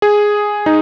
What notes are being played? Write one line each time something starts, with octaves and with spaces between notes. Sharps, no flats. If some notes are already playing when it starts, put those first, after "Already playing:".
G#4
D#4